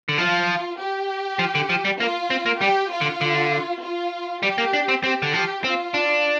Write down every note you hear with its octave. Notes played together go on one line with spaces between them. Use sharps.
D3
F3 F4
G4
F3
D3
F3
G3
A#3 F4
C4
A#3
G3 G4
F4
D3
D3
F4
G3 G4
A#3
D4
C4
C4 G4
D3
F3 G4
C4 F4
D4